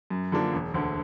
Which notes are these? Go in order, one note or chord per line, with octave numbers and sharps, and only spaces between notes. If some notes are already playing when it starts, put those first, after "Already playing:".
F#2
D3 F3 A#3 D4
E1
D2 D3